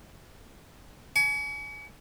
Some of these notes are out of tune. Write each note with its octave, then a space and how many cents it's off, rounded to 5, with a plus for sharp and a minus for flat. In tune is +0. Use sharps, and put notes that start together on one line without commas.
G#5 +25 C#6 +40